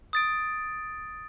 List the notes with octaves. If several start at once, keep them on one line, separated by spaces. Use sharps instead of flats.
D#6 A6 D7